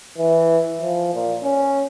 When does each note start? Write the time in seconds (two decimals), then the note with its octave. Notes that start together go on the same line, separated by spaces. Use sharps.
0.18 E3
0.81 F3
1.14 A#2
1.43 C#4